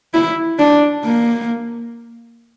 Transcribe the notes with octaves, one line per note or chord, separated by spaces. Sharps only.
E4
D4
A#3